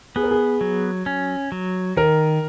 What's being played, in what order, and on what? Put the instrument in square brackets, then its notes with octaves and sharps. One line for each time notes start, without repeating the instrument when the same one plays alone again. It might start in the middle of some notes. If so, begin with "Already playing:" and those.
[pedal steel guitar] B3 [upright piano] G#4
[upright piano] A#4
G#4
[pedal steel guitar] F#3
C#4
F#3
[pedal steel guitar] D#3 [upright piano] A#4